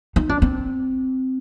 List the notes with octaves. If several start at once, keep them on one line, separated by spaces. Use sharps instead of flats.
D#4
D4
C4